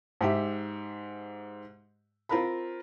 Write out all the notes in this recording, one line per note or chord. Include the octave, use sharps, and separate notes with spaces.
G#2 G4 E5
C4 F4 A#4 B5